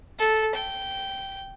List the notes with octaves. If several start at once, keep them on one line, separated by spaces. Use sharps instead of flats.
A4
G5